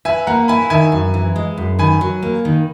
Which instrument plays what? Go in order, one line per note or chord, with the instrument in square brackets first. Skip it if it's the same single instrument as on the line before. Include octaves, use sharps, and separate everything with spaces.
[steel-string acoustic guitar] B4 [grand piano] E5 G#5
[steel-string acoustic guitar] A#3 [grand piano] F#5 A#5
[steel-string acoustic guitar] E4 [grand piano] G#5 B5
[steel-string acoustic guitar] D#3 [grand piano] E5 G#5
[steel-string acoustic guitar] F#2
E3
G#3
F#2
[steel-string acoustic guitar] D#3 [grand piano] G#5 B5
[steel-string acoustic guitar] F#3
A#3
D#3